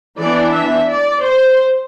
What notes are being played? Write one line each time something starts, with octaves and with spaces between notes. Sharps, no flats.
E3 B3 D4 D5
E5
D5
C5